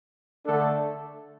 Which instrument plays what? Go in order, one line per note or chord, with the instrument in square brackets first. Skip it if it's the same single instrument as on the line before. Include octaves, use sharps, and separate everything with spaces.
[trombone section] D3 A3 D4 A4